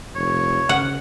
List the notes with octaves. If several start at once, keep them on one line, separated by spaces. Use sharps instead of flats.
F1 C#5
C#3 F#5